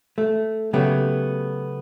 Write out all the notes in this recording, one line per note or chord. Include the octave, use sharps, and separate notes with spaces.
A3
C#3 F#3 A3 B3 G4